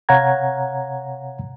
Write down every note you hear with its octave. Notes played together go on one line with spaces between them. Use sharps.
C3 C#5 F5 F#5 A#5 G#6